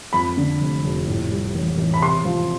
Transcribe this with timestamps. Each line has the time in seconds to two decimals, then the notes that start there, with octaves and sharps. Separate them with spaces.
0.13 F2 B5
0.37 D3
0.61 F1
0.84 F1
1.07 A2
1.30 G3
1.55 A1
1.78 A1
1.94 B5
2.01 C3 C6
2.25 F3